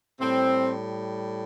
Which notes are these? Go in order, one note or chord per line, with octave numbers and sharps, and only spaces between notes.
A2 G3 C4